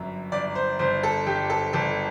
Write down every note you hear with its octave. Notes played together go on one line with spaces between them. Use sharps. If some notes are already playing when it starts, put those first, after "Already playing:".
Already playing: G1 F#2 E5
G1 D5
C5
G1 C5
A4
G1 G4
A4
G1 A4